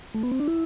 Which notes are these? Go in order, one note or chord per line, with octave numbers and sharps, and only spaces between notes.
A3
B3
C4
D4
E4